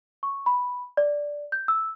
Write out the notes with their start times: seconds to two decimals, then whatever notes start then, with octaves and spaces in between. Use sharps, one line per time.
0.23 C#6
0.46 B5
0.97 D5
1.52 G6
1.68 E6